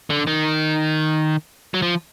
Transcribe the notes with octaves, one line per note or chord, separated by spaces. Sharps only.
D3
D#3
F#3
F3